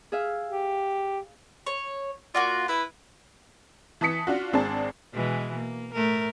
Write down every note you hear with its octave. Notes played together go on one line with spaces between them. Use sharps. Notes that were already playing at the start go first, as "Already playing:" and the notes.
G#4 E5 F5
G4
C#5
A#3 F4 F#4 D5
E4 B4
E3 A5 D#6 B6 C#7
D4 F4 F#4
G#1 C4 D4 G#4 A5
B2 E3 G#3
A#3
A2 A3 A#4